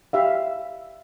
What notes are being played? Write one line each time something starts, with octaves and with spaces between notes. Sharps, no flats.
G4 E5 F5